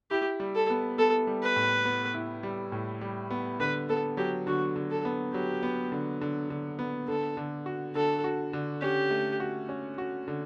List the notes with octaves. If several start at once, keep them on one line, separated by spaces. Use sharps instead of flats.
E4 G4
G3
A4
B3
B3 A4
G3
B4
A2
B3
E4
G3
A2
G3
B3
D3 B4
B3 A4
F#3 G4
D3 F#4
D3
A4
B3
F#3 G4
B3
D3
D3
D3
B3
D3 A4
D3
F#4
D3 A4
F#4
D3
C#4 G4
A3
F#4
C#4
F#4
D3